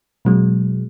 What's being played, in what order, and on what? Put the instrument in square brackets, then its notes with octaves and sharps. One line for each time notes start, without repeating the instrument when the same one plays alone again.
[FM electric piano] B2 F#3 G#3